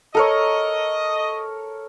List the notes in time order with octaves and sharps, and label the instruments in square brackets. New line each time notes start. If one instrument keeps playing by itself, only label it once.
[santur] A4 A#4 C#5 [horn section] D#5